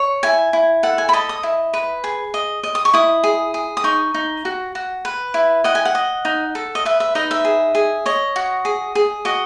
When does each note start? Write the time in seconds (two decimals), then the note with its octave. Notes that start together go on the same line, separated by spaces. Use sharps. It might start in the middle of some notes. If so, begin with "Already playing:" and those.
Already playing: C#5
0.23 E4 G#5
0.53 E4
0.83 A4 F#5
0.98 G#5
1.09 B5
1.13 D#5 A5
1.29 D#6
1.43 E4
1.74 B4
2.04 G#4
2.34 D#5
2.63 D#5
2.75 D#6
2.85 C#6
2.93 E4 D#6
3.24 G#4
3.54 G#4
3.77 D#6
3.84 D#4 C#6
4.14 D#4
4.45 F#4
4.75 F#4
5.05 B4
5.34 E4
5.64 D#5 F#5
5.75 G#5
5.85 F#5
5.95 D#5
6.25 D#4
6.55 A4
6.75 D#5
6.85 B4 E5
7.00 E5
7.15 D#4 D#5
7.31 E5
7.45 G#4
7.75 G#4
8.06 C#5 D#5
8.36 F#4
8.65 G#4
8.95 G#4
9.25 F#4 D#5